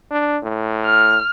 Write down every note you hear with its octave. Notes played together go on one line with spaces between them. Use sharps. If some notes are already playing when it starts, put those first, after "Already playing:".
D4
A2
F6